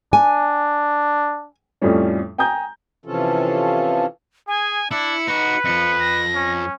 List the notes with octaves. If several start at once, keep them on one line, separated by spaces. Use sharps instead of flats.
D4 G#5
F2 A2 F3 G3 C#4
G5 G#5 A#5 D#6 G6
C3 E3 F3 C#4 F4 A4
G#4 G#5
D4 E4 C#7
D#4 F#4 B4
F2 F3 C#7
A#6
C#4